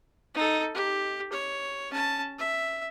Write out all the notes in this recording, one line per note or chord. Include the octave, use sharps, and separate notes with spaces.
D#4 A4
G4
C#5
C#4 A5
E5